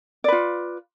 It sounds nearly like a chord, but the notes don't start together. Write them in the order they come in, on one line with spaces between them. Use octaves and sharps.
D5 B4 F4